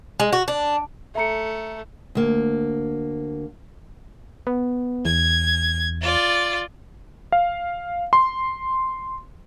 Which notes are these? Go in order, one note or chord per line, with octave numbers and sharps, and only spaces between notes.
G#3
F#4
D4
A3 E5 A#5 C#7
D2 A#3
B3
E2 G#6
F4 D5
F5
C6